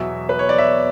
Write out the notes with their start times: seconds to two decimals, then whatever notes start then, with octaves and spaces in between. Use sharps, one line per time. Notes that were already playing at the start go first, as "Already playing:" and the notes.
Already playing: E2 B2 F#3 E5
0.29 B4
0.39 C#5
0.49 D5
0.58 E5